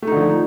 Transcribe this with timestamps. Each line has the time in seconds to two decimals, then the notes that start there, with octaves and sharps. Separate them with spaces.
0.02 A3
0.07 D#4
0.12 D3
0.17 F3